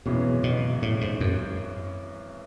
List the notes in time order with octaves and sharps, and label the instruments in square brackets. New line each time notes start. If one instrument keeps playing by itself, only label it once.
[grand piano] G#1 F#2 E3 G#3 C#4 [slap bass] B2
[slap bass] B2
A2
G#2
F#2